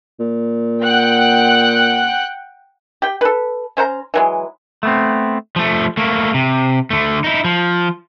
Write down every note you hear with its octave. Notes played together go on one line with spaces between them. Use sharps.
A#2
F#5 G5 F#6
G4 G5
A4 B4
C#4 C5 F#5 A#5
E3 F#3 G#3
A3 B3 C4
F3 A3
A3 A#3
C3
D3 A3
D#4 E4
F3